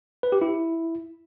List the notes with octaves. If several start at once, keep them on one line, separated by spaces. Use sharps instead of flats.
B4
G4
E4